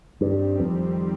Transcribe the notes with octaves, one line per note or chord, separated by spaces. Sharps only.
G2 D#3 G3 C4
F2